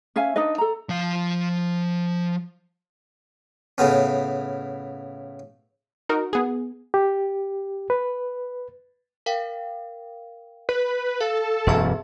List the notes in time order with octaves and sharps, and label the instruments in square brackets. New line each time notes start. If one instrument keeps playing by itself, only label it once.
[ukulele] C#4 E5 F5 G#5
D4 D#4 B4 D#5
A4 A#5
[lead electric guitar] F3 F5
[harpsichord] A2 C#3 B3 C#4
[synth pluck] D#4 F#4 A#4
B3 G#4
[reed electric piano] G4
B4
[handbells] A#4 F5 G5
[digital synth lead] B4
[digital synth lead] A4 [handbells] F5
[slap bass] E1 F#2 [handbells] G#4 E5 A5